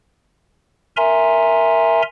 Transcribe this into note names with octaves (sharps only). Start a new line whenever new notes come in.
A#4 E5 G#5 A#5 C6